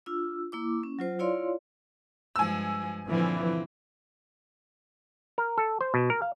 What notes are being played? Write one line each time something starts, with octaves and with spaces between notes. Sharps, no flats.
D4 F4 E6
A#3 E4 D6
C#4
F#3 F4 C5
E4 F4 C#5 D5 F5 C6
G2 F3 G#3 G#5 E6
A#2 D3 E3 F3 C4
A#4
A4
C5
B2
A#4
F5